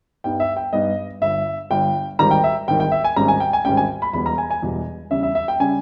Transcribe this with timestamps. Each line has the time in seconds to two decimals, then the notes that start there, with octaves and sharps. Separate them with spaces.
0.24 G2 G3 B3 D#4 G5
0.40 E5
0.57 G5
0.73 G2 G3 B3 D#4 D#5
1.21 G1 G2 G3 E5
1.70 G1 G2 G3 G5
2.19 G#1 G#2 D#3 G3 A#5
2.31 G5
2.44 E5
2.68 G#1 G#2 D#3 G3 G5
2.80 G5
2.92 E5
3.04 G#5
3.16 G#1 G#2 G3 C#4 A#5
3.28 G#5
3.40 G5
3.53 G#5
3.65 G#1 G#2 G3 C#4 G5
3.77 G#5
4.02 B5
4.13 E1 E2 B2 G3 B3 B5
4.26 A#5
4.38 G#5
4.50 G#5
4.62 E1 E2 B2 G3 B3
5.11 E2 C#3 G3 C#4 E5
5.23 E5
5.35 E5
5.48 G5
5.60 C#3 G3 C#4 G#5